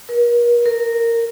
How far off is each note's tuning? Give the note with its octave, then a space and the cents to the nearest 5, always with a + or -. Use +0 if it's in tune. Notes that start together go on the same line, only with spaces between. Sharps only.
A#4 +40
A#4 -10